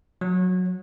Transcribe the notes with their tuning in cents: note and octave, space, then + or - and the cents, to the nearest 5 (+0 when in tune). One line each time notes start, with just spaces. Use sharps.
F#3 -15